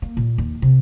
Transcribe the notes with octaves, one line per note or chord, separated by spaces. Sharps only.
A#3
A#2
D#2
C3